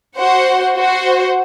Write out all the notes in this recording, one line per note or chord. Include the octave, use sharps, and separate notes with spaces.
F#4 C5 F#5
F#4 C5 F#5